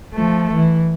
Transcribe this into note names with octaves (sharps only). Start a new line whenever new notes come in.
F3 A3
E3